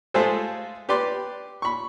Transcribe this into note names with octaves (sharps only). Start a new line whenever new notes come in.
G#3 A3 F4 G#4 A4 C5
G4 B4 D5 C6 D6
B5 C#6